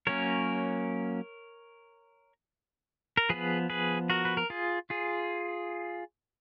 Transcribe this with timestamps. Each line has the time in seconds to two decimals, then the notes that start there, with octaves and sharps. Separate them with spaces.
0.07 F#3 A#3 C#4 A#4 C#5
3.17 A#4
3.29 F3 B3 G#4 B4
3.70 G#4 B4
4.10 F#4 A#4
4.25 B4
4.37 A#4
4.50 F4 G#4
4.90 F4 G#4